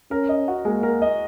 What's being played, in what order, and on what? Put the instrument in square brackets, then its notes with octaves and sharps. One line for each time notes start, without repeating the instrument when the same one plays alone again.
[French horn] C#4 [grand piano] A#4
[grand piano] D#5
F#4
[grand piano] G#3 [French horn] A#3
[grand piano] A#4
D#5